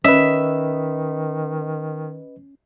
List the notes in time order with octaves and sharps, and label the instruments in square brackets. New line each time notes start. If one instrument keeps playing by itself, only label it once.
[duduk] D#3 [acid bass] C#4 [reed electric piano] B4 D#5 [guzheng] E5